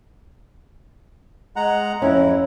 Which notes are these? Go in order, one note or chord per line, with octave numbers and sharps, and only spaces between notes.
G#3 F#5 A#5
F2 C#4 E4